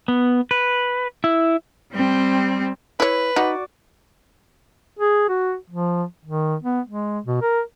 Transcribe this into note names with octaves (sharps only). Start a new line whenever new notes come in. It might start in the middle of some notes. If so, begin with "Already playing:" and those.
B3
B4
E4
G3 C4
E4 B4 C#5
D#4 F#4 D5
G#4
F#4
F3
D#3
B3
G#3
B2
A#4